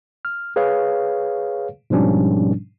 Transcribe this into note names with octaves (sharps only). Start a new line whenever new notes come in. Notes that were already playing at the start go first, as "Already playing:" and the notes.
F6
G#4 B4 C#5 F5
G#2 B2 F3 G3 C#4 D4